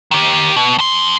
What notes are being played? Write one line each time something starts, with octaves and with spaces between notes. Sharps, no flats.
D#3 G4
B2
F2 C6